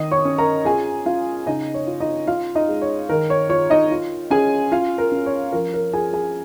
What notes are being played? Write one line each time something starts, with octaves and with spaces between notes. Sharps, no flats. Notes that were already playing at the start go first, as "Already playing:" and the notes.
Already playing: D#3 D#5 D#6
C#5 C#6
C#4
A#4 A#5
F4 G#4 G#5
C#4 F4 F5
C#3 D#4 D#5
C#5
F4
D#4 D#5
F4 F5
D#4 D#5
G#3
C#5
D#3 A#4
C#5
F4 C#5
D#4 D#5
F4
C#4 G#4 G#5
F4 F5
A#4
C#4
C#5
F3 A#4
A#4
F4 G#4 G#5
G#4 G#5